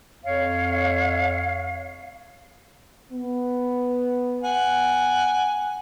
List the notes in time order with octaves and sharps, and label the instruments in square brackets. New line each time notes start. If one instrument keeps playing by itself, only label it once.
[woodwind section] F2 C#5 [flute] F5
[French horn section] B3
[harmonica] F#5 G#5